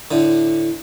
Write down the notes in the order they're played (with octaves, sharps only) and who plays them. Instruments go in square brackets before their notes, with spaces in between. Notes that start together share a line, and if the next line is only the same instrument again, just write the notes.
[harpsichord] A2 D3